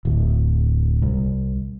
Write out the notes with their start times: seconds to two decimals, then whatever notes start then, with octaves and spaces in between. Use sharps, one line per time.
0.05 D1
1.02 C2